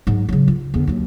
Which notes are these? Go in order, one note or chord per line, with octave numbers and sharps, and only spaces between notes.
G#2 F#3
C#3 F#3
F4
E2 D3
D#2 F#3